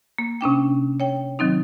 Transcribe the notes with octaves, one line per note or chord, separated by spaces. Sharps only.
A#3
C3 C#4 D4 G5
C#5 G5
D#3 F#3 C4 D#4